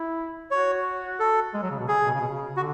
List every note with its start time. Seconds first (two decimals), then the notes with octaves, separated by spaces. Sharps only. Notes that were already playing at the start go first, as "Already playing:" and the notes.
Already playing: E4
0.51 F#4 C#5
1.19 A4
1.54 G#3
1.63 F#3
1.71 C#3
1.80 B2
1.88 C#3 G#4
2.06 B2
2.14 C#3
2.21 B2
2.28 C#3
2.56 D3 F#4